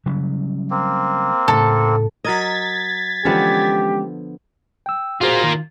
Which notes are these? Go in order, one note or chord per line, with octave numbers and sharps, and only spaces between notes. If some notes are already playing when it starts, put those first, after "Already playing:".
C#3 F#3 G3
A#3 C4
A2 C#3 A4
F#3 A#4 D#5 G#6 A6 B6
D3 E3 F3 G#3 B3 C#4 G4
G5 E6
A#3 F4 F#4 G#4 C5
D#3